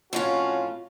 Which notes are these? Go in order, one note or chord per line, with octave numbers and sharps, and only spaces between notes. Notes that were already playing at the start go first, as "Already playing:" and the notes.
F2 A2 C#4 F4 F#4